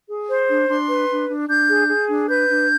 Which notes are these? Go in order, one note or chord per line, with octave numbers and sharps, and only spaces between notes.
G#4
C5
D4
D4 C6
B4
D4
D4
D4 G6
G#4
G#4
D4
B4 G6
D4